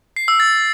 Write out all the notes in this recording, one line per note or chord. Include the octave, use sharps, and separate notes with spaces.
C7
E6
A6